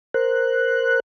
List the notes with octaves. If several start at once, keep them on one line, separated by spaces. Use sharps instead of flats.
A#4 C5 F#6